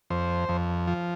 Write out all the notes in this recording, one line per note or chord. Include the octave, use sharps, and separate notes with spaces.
F2 C5
F2
F3